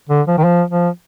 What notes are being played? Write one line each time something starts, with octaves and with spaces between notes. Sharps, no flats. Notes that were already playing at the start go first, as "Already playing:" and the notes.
D3
F3
D#3
F3
F3